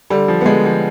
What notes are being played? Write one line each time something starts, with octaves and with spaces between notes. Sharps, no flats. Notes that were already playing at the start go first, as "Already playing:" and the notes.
D3 G3
F3
B3
D3 G#3
F3